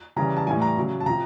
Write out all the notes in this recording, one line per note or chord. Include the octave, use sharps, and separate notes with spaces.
C#3 E3 G3 A#5
A5
A2 E3 G3 G#5
A#5
C#3 F#3
A5
C3 F3 A#5